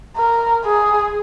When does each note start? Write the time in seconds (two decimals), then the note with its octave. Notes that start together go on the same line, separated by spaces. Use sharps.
0.17 A#4
0.65 G#4